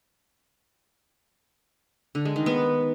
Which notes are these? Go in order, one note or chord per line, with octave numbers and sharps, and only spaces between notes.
D3
G#3
D#3
B3